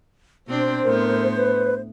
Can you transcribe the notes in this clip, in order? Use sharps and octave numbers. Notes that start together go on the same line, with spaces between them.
B2 C4 D4 C5
A2 B3 A#4
B4